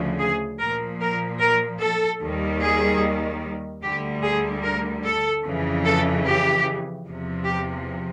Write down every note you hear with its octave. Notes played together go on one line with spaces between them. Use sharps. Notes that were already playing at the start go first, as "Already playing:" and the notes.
Already playing: D2 C#3 F3
G#4
A#2 F3 A#4
A#4
A#4
A4
D#2 D#3 G3
G#4
D2 D3 G3 G4
G#4
A#4
A4
F2 C#3 E3
A4
G4
E2 C3 F3
G4